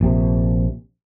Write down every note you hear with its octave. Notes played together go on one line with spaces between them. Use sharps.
A#1 C3